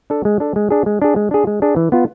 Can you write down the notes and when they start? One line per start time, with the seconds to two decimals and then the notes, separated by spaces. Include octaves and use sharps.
0.10 D4 A4
0.25 G#3
0.40 D4 A4
0.56 G#3
0.70 D4 G#4
0.86 G#3
1.02 D4 G#4
1.16 G#3
1.31 D4 G#4
1.47 G#3
1.62 D4 G#4
1.76 E3
1.92 B3 F4